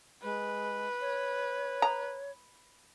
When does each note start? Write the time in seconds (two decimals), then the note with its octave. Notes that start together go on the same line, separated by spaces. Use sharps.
0.23 G#3 B4
1.01 C#5
1.82 A#5